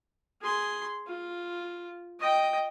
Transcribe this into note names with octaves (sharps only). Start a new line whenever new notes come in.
G#4 C6
F4
D#5 G5